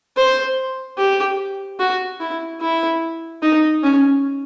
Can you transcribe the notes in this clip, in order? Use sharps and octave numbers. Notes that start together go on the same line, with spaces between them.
C5
G4
F#4
E4
E4
D#4
C#4